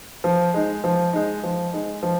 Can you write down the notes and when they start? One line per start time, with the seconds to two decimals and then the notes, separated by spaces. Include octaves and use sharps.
0.24 F3
0.54 G#3 D#4
0.84 F3
1.13 G#3 D#4
1.43 F3
1.73 G#3 D#4
2.03 F3